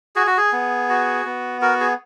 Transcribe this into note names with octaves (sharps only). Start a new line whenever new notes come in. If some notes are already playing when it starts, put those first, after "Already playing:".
F#4 G#4
F#4
G#4
B3
F#4
B3
F#4 A#4
G#4